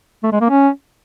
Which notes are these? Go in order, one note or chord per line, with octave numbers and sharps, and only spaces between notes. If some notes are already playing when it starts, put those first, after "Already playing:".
A3
G#3
A#3
C#4